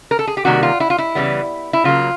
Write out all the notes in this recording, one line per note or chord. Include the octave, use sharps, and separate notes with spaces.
A#4
A4
G#4
G4
C3 D#3 G3 A#3 F#4
F4
E4
F4
E4
C#3 E3 G3 B3
E4
C#3 F#3 A#3 F4